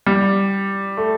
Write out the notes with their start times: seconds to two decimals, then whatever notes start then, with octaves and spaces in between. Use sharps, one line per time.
0.06 G3
0.97 A3